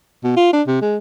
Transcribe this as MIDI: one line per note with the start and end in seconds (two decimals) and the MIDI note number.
0.24 0.34 47
0.37 0.53 65
0.53 0.62 62
0.67 0.81 48
0.82 0.97 56